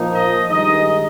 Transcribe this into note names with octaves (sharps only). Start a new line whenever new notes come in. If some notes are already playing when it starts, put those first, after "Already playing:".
Already playing: A#2 F3 A#3 D#4
D#5
G2 D#3 G#3 D#4 D#5